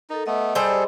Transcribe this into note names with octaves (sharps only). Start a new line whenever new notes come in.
D#4 A4 A#4
A3 B3 D#5
G3 G#4 A4 C5